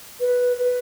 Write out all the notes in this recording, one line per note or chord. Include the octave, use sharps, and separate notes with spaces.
B4
B4